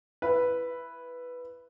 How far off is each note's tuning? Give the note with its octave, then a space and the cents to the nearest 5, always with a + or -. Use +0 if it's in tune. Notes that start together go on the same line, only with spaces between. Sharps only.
E4 +15 B4 +0